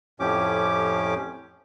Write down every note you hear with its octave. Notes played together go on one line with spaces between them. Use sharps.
F2 A2 F3 C#4 G4 D6